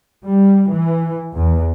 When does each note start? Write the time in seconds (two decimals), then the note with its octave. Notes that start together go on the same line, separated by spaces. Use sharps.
0.25 G3
0.73 E3
1.35 E2